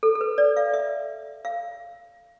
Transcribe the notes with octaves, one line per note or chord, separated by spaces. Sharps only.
A4
A4
B4
D5
F5
E5
F5